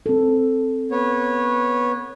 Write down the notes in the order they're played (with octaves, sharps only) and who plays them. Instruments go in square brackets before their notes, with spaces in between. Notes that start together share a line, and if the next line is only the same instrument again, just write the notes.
[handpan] C4 A4
[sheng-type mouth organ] B3 C#5